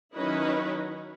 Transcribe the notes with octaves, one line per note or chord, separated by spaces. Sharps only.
D#3 F#3 C#4 E4 B4 D#5